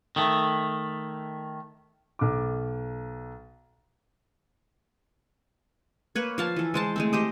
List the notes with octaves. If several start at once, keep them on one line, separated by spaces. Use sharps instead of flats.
D#3 A3
B1 D6
A#3 B4 C#5
F3 F5 A5
E3 A4
G#3 C5 A5
G#3 A3 C4
G4 C5 D#5